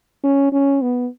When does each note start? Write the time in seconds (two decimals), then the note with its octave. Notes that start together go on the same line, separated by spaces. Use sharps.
0.24 C#4
0.52 C#4
0.82 B3